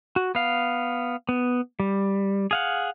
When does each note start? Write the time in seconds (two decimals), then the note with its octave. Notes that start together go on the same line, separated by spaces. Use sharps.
0.16 F#4
0.35 B3 F5
1.29 B3
1.80 G3
2.51 G#4 F5 F#5